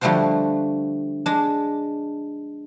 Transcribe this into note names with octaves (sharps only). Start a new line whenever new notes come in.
D3 F3 G3 A3 F#4 C5
G#3 D4